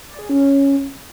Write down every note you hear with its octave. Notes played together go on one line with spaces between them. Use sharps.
D5
G#4
C#4